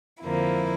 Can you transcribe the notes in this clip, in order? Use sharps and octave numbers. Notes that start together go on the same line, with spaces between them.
F2 D3 F3 A#3 E4